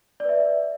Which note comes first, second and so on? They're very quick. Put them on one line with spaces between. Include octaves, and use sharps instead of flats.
D5 B4 E5